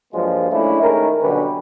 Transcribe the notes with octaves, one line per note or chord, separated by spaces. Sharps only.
G2 F3 F#3 G#3 A#3
G#3 A3 C#4 D4 E4
D#3 G#3 A3 C#4 A#4
B2 D3 F#3 G3 C#4 B4